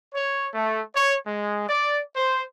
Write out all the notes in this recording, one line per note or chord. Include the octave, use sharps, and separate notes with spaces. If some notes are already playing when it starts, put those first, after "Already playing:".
C#5
A3
C#5
G#3
D5
C5